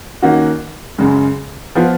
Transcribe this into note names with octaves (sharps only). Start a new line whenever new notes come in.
D#3 A#3 C#4 F#4
F#2 C#3 G#3
F3 B3 F4